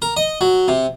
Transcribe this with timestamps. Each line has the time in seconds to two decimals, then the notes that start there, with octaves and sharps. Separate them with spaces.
0.02 A#4
0.17 D#5
0.41 F#3
0.68 C3